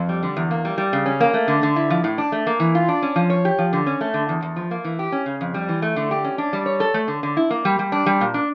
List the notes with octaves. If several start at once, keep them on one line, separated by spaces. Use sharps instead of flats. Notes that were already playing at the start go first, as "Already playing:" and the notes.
Already playing: F2
G3
D3
E2
A#3
G3
G3
C#3
C#4
A#3
A3
D3
D3
E4
F3
A2
D4
A3
A#3
E3
F4
D4
C#4
F3
C#5
G4
F3
D3
C#4
A3
D3
E2
E2
F3
A#3
E3
G4
C#4
C#3
F2
G3
E3
A3
D3
G4
C#4
D4
G3
C#5
A4
A3
D3
D3
E4
A#3
G3
G3
D4
G3
A#2
D4